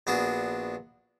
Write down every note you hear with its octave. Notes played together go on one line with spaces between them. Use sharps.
A#1 B3 D4 F#4 G#4